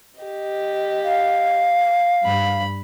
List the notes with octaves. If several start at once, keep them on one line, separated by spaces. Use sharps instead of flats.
G4 D#5
F5
G2 B5